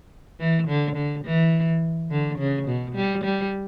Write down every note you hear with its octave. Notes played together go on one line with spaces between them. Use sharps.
E3
D3
D3
E3
D3
C#3
B2
G3
G3